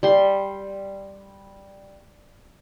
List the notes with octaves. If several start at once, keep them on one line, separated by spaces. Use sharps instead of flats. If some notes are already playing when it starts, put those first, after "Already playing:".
G3 C6